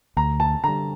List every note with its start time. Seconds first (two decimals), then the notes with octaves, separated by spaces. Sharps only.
0.17 D2 A#5
0.40 A5
0.64 D3 G3 A#5